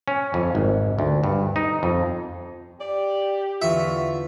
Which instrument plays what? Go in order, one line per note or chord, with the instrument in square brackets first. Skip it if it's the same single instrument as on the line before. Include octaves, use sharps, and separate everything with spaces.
[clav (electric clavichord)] C#4
F2
G#1
D2
G2
D#4
F2
[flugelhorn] G4 [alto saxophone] D5
[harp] E2 D3 C#6 [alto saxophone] F4 [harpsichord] E5